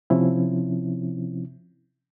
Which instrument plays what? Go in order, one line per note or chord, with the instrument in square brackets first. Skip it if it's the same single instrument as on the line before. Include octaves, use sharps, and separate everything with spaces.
[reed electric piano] C3 F3 C4 C#4 E4